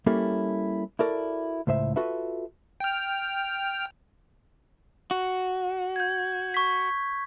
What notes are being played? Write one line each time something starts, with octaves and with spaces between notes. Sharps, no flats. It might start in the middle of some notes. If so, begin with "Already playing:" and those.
G3 A#3 C#4 E4 G4 A4
E4 F#4 A4 A#4 D5
C#2 A2 C5 E5
F4 F#4 A4 B4 E5
G5 F6
F#4
G6 G#6
C#6 B6